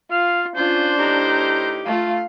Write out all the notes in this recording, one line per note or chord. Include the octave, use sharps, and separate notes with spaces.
F4 F5
C#4 D4 F4 C5
A2 D#4 G4 A#5
A3 F4 F5